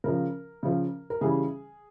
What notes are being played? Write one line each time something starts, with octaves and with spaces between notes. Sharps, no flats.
C#3 F3 A#4
C#3 F3
A#4
C#3 E3 G3 G#4